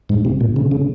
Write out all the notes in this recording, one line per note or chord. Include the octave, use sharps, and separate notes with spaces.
G#2
C3
A#2
C#3
C#3